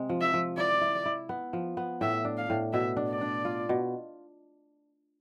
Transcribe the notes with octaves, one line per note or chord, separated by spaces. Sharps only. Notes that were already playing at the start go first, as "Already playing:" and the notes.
Already playing: C3 G#3
F3
E5
F3
E4 D5
E4
E4
B3
F3
B3
A2 E5
D4
F5
A2
B2 E5
D4
D5
D4
F4
B2